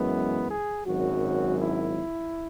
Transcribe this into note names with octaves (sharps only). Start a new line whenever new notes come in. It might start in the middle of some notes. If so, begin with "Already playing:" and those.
Already playing: F#2 E3 G#3 B3
G#4
G#1 F#2 F#3 F#4
E4